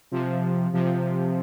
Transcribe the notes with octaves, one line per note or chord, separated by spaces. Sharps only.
C3 F3
C3 F3